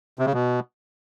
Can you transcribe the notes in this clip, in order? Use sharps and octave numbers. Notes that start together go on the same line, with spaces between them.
C3
C#3
B2